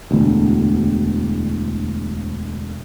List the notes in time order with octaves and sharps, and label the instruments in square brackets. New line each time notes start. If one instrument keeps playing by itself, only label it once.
[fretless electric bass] E1 D2